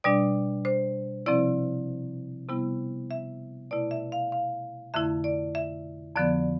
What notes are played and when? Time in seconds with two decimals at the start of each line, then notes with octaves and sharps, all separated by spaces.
0.04 B2 G3 D4 D5
0.65 C5
1.26 C3 F3 C4 E4 D5
2.49 C3 G3 B3 E4
3.11 E5
3.71 B2 A3 E4 D5
3.91 E5
4.12 F5
4.32 F5
4.94 F2 D3 A3 E4 E5
5.24 D5
5.55 E5
6.16 F2 D3 F3 B3 D5